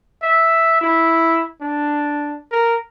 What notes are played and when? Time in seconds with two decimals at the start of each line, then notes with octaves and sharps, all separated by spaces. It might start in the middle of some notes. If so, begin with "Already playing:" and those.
0.23 E5
0.81 E4
1.61 D4
2.51 A#4